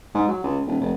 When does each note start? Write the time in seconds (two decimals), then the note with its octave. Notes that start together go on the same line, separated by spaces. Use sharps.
0.15 G#2
0.28 F#3
0.44 C#2
0.67 D#1
0.81 F1